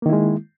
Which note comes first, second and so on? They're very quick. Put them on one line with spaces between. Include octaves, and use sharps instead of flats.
A#3 D#3 E4 G#3